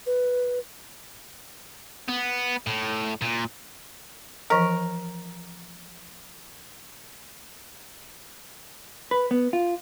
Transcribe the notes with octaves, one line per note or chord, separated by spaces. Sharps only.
B4
B3
A2
A#2
E3 F3 A#4 D#5
B4
B3
F4